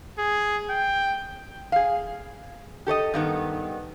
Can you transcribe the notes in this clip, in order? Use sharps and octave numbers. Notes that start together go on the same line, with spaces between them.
G#4
G5
G#4 F5
G4 A4 C#5 D#5
G2 D#3 B3